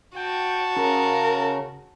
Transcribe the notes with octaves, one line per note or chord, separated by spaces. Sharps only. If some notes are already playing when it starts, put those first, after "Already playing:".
F#4 G5 A5
C#3 A#4